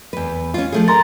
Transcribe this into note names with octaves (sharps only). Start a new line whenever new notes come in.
E2 B4
C#4 F4
F3 A3 G#4
A#4 A#5 C6 A6